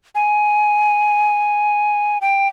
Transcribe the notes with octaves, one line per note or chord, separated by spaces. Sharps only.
G#5
G5